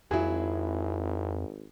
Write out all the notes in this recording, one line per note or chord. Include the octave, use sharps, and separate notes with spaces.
G#1 F2 F#3 E4 F4 G#4